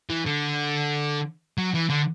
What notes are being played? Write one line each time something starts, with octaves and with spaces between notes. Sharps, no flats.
E3
D3
F#3
E3
D3